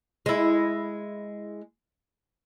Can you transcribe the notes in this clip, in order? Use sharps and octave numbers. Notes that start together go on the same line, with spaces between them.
G#3 E4